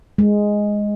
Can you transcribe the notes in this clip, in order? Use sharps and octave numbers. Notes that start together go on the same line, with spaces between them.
G#3